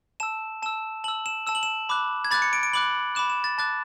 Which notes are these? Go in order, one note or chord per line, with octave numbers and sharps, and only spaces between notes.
A5 E6 E7
A5 E6 E7
A5 E6 F#7
E7
A5 E6 E7
F#7
E7
B5 D6 F#6
G#6
B5 D6 F#6 A6
C#7
D7
D7
B5 D6 F#6 F#7
B5 D6 F#6 E7
E7
A6
A5 D6 F#6 A6